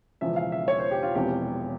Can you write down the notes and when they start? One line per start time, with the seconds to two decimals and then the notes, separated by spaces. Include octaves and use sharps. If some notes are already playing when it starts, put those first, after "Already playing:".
0.21 E1 E2 C#3 F3 E5
0.36 F5
0.52 E5
0.68 C#5
0.79 C5
0.91 G4
1.03 F4
1.15 E1 E2 C3 F3 G4